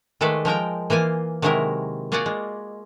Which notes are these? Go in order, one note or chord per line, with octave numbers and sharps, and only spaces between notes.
D#3 G#3 A3 A4 B4 D5
F3 G#3 A#4 G5
E3 A#3 F4 G#5
C3 D#3 F#3 G#3 E4 A#4
A#3 F4 F#4 G#4 D5 F#5
G#3